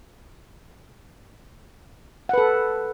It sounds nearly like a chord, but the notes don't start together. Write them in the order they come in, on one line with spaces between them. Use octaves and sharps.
F#5 B4 A4